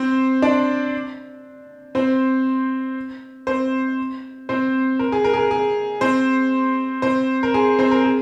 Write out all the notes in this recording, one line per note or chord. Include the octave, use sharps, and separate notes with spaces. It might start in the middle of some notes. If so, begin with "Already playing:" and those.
Already playing: C4 C5
D4 D5
C4 C5
C4 C5
C4 C5
A#4
G#4
A#4
G#4
A#4
G#4
C4 C5
C4 C5
A#4
G#4
C4 C5
A#4
G#4